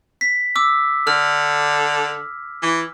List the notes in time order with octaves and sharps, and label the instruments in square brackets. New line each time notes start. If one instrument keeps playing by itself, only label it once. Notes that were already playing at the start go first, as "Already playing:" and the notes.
[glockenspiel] B6
D6 E6
[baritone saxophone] D3 [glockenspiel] F6
[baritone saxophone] E3